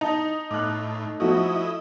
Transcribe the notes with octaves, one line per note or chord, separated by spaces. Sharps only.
D#4 A5
A2 D6 F#6
F3 A3 E4 F#4 D#5